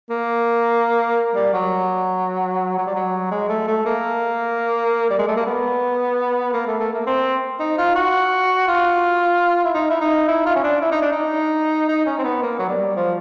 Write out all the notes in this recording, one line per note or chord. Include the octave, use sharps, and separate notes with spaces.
A#3
G3
F#3
F#3
G3
F#3
G#3
A3
A3
A#3
G3
G#3
A3
A#3
B3
A#3
A3
A3
A#3
C4
D#4
F4
F#4
F4
E4
D#4
E4
D#4
E4
F4
C#4
D4
E4
D#4
D4
D#4
D#4
C#4
C4
B3
A#3
F#3
G3
F3